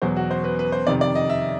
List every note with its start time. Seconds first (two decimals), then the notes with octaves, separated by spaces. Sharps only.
0.02 E2 B2 F#3 C5
0.16 F#4
0.31 C5
0.44 B4
0.59 B4
0.72 C5
0.87 F2 C3 D#3 D5
1.01 D5
1.15 D#5
1.30 E5